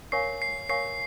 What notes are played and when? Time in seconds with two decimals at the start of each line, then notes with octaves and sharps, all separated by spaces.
0.12 A#4 C#5 F5 G#5 C#6 C7
0.42 C7
0.69 A#4 C#5 F5 G#5 C#6 C7